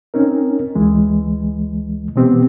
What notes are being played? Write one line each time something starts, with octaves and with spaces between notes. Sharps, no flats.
C4 C#4 D#4 A#4
D2 E3 G#3
B2 E3 B3 C4 G4